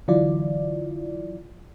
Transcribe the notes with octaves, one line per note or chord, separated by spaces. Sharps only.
D3 E3 F#3 E4 F4 D5